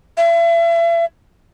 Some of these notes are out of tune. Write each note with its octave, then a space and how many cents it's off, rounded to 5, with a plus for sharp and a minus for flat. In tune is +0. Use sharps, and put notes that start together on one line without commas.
E5 +40